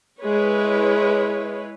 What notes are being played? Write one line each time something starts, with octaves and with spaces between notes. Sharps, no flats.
G#3 E4 B4 C#5